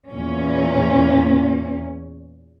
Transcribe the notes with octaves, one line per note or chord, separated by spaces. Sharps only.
E2 A#2 C#4